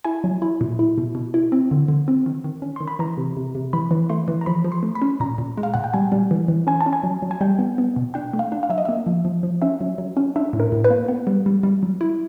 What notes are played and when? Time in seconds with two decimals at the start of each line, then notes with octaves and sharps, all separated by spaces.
0.05 E4 G#5
0.24 F#3
0.42 E4
0.61 A#2
0.79 E4
0.98 B2
1.15 B2
1.34 E4
1.52 C4
1.71 D3
1.88 D3
2.08 C4
2.26 D#3
2.44 D#3
2.62 C#4
2.76 D#3 C6
2.88 B5
2.99 E3 A#5
3.17 C3
3.37 C3
3.55 C3
3.73 E3 B5
3.91 E3
4.10 A3 C6
4.28 E3
4.41 A#5
4.46 F3 B5
4.64 F3
4.72 C6
4.83 A3
4.95 B5
5.02 C#4
5.20 A#2 A#5
5.38 A#2
5.57 G#3
5.63 F5
5.74 A#2 F#5
5.84 G5
5.94 G3 G#5
6.12 G3
6.31 E3
6.48 E3
6.67 C#4 G#5
6.81 A5
6.86 C#4
6.93 G#5
7.04 F#3
7.22 F#3
7.31 G#5
7.41 G3 G5
7.59 B3
7.78 B3
7.96 B2
8.14 D4 G5
8.33 A3
8.39 F5
8.52 D4
8.63 F5
8.70 F#3 E5
8.78 D#5
8.85 A#3 E5
9.06 F3
9.25 F3
9.43 F3
9.62 C#4 E5
9.81 F#3
9.98 F#3
10.17 C#4
10.36 D4 E5
10.53 A2
10.60 A#4
10.72 A2
10.84 B4
10.90 A#3
11.08 B3
11.27 G3
11.46 G3
11.63 G3
11.83 F#3
12.01 E4